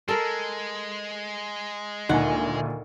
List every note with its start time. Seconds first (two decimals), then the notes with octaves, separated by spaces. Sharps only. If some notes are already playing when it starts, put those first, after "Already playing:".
0.08 G#3 A4 A#4
2.09 D2 A#2 D#3 F#5 G#5